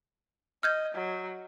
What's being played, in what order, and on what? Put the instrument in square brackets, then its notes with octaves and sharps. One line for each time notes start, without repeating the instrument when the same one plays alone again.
[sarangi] D#5 [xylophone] F6 G6 G#6
[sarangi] F#3